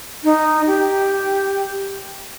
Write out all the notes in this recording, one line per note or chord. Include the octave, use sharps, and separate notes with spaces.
D#4
G4